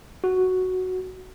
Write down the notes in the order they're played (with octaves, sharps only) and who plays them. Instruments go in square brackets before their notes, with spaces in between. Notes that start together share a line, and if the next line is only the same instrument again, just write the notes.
[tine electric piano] F#4